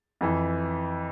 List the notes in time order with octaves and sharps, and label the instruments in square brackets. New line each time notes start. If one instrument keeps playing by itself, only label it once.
[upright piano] F2 E3